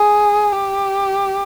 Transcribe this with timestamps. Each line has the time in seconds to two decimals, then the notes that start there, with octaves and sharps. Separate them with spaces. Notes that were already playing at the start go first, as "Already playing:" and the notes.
Already playing: G#4
0.52 G4